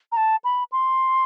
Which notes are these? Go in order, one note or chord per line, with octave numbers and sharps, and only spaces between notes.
A#5
A5
B5
C6